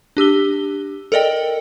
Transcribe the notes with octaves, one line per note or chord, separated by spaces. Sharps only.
D4 G4 E6 G7
A4 A#4 D5 D#5 G5